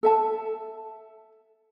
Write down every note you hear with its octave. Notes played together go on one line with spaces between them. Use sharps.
A4 E5 A5